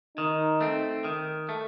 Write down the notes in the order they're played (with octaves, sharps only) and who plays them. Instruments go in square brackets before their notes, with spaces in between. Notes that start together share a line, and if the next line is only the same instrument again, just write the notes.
[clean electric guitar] D#3 [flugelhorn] D#4
[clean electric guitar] A3 C4
D#3
A3